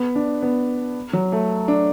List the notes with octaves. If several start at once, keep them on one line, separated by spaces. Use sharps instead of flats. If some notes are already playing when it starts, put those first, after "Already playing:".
Already playing: B3
D4
B3
F#3
A3
D4